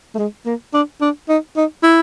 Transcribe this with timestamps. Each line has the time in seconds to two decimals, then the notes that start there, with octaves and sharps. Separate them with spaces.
0.14 A3
0.18 G#3
0.46 A#3
0.73 D4
1.01 D4
1.29 D#4
1.56 D#4
1.83 E4